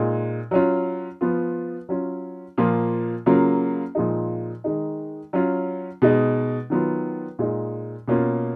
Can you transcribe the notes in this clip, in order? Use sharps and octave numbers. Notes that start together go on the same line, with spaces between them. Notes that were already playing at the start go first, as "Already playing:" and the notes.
Already playing: A#2 G#3 D#4
F#3 C#4 F4
F3 B3 F4
F#3 C#4 F4
A#2 F3 A#3 F4
C#3 F#3 A#3 F4
A#2 F3 G#3 D#4
D#3 G#3 D#4
F#3 C#4 F4
B2 G#3 D#4
D#3 F#3 B3 F4
A#2 G#3 D#4
B2 A#3 C#4 F4